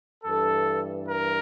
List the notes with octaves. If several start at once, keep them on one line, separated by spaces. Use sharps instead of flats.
G2 E3 A4
A#4